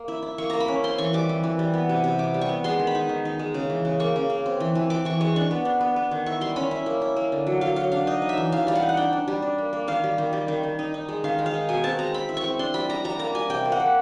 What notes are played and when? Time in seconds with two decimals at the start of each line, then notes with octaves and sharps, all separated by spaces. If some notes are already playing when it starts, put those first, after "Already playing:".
Already playing: A#3
0.08 E4
0.23 E4
0.38 A#3 C#6
0.50 A#3 A#5
0.60 B5
0.68 C#4
0.84 C4 C6
0.98 E3 C#6
1.13 G3 D6
1.29 E3
1.44 E3
1.59 G3
1.74 B3
1.89 C3
2.04 C3
2.19 B3 D6
2.34 G3
2.41 C#6
2.49 B3
2.64 G#3 C6
2.79 D#3
2.87 B5
2.95 D#4
3.09 D#3
3.25 D#4
3.39 G#3
3.54 C#3
3.70 E3
3.85 C#3
4.00 A#3 C#6
4.16 C#3
4.30 A#3
4.46 C4
4.60 E3
4.75 E3
4.90 E3 D6
5.05 E3 C#6
5.21 G#3 C#6
5.36 D4 C#6
5.51 B3
5.65 D4
5.81 B3
5.96 B3
6.11 D#3
6.26 E4 C#6
6.41 G3 C6
6.56 C#4 B5
6.71 E4
6.86 A#3
7.02 E4
7.16 A#3
7.32 D3
7.47 F#3
7.61 F#3 F5
7.76 F#3 F5
7.92 D4 F5
8.07 D#4 D#5
8.22 D#4
8.29 E5
8.37 E3
8.52 E3 F5
8.67 G3 F5
8.75 F#5
8.82 D#4
8.89 F#5
8.97 D4 G5
9.13 D4
9.28 G3
9.42 D4
9.58 A#3
9.73 A#3
9.88 D#3 F5
10.04 G3
10.18 D#3
10.33 G3
10.48 D#3
10.63 D#3
10.79 D#4
10.94 D#4
11.09 G#3
11.24 D#3 F5
11.39 G#3
11.46 F5
11.54 D#4
11.69 B2 G#5
11.84 C4 A5
11.99 G#3 A#5
12.14 C4 B5
12.29 E4
12.37 C#6
12.44 C4
12.59 D4 C6
12.74 G3 B5
12.89 G3 A#5
13.04 G3 A#5
13.19 A#3 A#5
13.35 G3 G#5
13.50 C3 G5
13.65 A#3
13.72 F#5
13.80 A#3